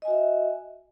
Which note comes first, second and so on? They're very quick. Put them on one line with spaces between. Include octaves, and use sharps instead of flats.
D#5 G#5 F#4 E5